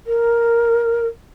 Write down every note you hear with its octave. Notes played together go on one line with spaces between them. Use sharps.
A#4